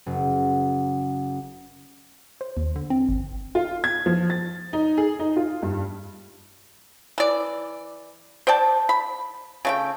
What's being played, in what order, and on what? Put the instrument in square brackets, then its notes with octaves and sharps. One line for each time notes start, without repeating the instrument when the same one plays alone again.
[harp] F#1
[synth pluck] C5
D#2
D3
C4
G1
[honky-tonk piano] F4
G#6
F3
A6
D#4
G#4
D#4
F4
G2
[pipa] E3 D5
C5 D5 G5 A5
B5
C#3 A3 G5